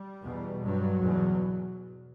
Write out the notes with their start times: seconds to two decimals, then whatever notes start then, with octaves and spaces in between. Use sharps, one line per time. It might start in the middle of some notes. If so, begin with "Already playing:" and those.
Already playing: G3
0.22 E2 B2
0.63 G2 F#3
1.03 E2 B2